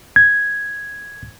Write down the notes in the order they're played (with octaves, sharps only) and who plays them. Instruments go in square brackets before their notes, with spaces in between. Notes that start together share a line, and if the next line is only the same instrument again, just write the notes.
[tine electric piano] G#6